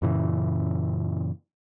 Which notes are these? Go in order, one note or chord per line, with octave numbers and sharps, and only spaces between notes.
F#2 A#2 C#3 E3